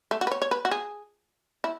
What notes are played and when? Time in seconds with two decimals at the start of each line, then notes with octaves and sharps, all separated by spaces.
0.11 A3
0.21 F#4
0.27 B4
0.31 C#5
0.42 C#5
0.51 B4
0.65 F#4
0.71 G#4
1.64 E4